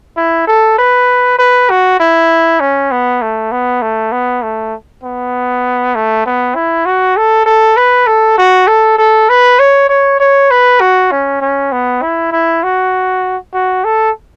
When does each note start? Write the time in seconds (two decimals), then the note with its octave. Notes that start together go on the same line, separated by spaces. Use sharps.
0.17 E4
0.47 A4
0.78 B4
1.39 B4
1.70 F#4
2.00 E4
2.60 C#4
2.92 B3
3.22 A3
3.52 B3
3.82 A3
4.12 B3
4.42 A3
5.03 B3
5.95 A3
6.26 B3
6.55 E4
6.86 F#4
7.17 A4
7.46 A4
7.77 B4
8.07 A4
8.38 F#4
8.68 A4
8.98 A4
9.29 B4
9.59 C#5
9.89 C#5
10.20 C#5
10.51 B4
10.80 F#4
11.11 C#4
11.41 C#4
11.72 B3
12.02 E4
12.32 E4
12.63 F#4
13.54 F#4
13.84 A4